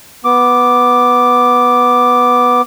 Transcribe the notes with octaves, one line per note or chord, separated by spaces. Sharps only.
B3 D6